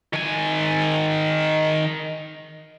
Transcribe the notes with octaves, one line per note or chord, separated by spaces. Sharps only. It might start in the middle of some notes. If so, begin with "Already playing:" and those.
D#3 G#5